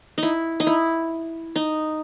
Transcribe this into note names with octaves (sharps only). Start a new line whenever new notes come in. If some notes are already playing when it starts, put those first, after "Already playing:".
D#4
E4
D#4
E4
D#4